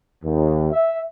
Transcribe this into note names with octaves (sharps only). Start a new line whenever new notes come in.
D#2
E5